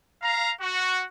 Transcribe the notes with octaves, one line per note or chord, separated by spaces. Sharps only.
F5 A#5
F#4